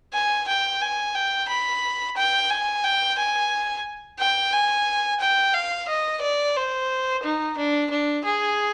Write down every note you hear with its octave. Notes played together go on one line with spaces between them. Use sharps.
G#5
G5
G#5
G5
B5
G5
G#5
G5
G#5
G5
G#5
G5
F5
D#5
D5
C5
D#4
D4
D4
G#4